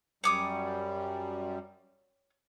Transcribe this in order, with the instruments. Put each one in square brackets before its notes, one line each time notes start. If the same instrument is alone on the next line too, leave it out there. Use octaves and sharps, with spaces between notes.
[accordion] F#2 G3 [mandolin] C#5 D6 D#6